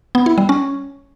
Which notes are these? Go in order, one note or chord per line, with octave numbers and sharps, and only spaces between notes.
B3
E4
G3
C#4